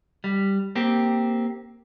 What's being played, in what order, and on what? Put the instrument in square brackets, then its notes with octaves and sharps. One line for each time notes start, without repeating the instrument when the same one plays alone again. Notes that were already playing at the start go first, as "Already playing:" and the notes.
[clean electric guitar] G3
A#3 C4 G4